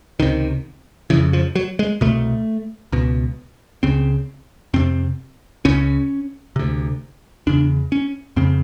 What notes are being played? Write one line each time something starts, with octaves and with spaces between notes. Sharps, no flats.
C#2 C3 D#3
F2 C#3 E3
F3
F#3
G#3
C2 B2 A3
C#2 B2
C#2 C#3 C4
F2 C3 C4
C#2 C#3 C#4
D2 C3
E2 C#3 D4
C#4
F2 C#3 C4